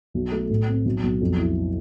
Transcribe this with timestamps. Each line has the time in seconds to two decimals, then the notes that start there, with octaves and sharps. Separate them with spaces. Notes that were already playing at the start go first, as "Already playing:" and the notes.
0.14 B1
0.32 A3
0.49 A2
0.67 C4
0.85 B1
1.03 B1
1.21 F2
1.38 E4